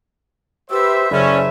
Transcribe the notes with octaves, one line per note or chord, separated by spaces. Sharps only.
G4 B4 C5 E5 E6
F#1 C#4 D5 E5